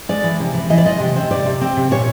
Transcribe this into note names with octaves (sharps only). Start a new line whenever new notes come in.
G#3 D5
E3
C3
E3
E3 D#5
D5
G#3 D#5
C3
C4
C3 D5
C3
C4
C3
A#2 C#5